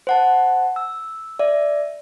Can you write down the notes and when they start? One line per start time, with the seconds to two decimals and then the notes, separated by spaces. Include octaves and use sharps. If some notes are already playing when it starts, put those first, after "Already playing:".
0.07 C5 F#5 A5
0.76 E6
1.39 D5 E5